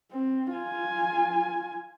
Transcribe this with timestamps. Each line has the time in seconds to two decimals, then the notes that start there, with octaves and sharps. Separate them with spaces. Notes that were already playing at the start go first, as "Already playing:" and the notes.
0.12 C4
0.52 F4 G#5